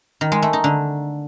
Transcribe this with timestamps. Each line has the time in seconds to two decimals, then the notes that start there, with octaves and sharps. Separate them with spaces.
0.21 D#3
0.32 G#3
0.42 A3
0.53 D#4
0.64 D3